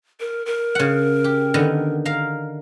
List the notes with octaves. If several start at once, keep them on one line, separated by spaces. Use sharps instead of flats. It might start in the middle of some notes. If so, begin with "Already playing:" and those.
A#4
A#4
C#3 F#5
G4
D3 D#3 B3
A#4 F5